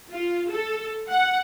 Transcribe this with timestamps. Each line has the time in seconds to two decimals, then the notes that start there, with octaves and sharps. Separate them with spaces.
0.10 F4
0.50 A4
1.08 F#5